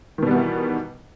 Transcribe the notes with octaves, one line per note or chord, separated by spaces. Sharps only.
B2 D#3 E3 G3 B3